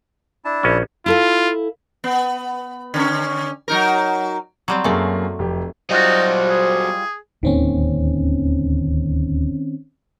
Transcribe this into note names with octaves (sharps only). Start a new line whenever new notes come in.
D4 E4 A5
A#1 C#4
E4 F4 A4 F5
B3
D3 C#4
F#3 D#4 A#4
F#3 G3 C4
F#2 A3 A#3 G#4 D5
F1 G4
F#3 G3 D#4 F4 F#4 C5 D#5
G#4
D1 D#2 D#3 A#3 C4 C#4